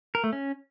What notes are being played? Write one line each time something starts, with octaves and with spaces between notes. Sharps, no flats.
A#4
A3
C#4